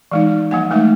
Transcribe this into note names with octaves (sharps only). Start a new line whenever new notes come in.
E3 G#3 D#4
F3 G3 A#3 F#5
G#3 A3 D#4 E5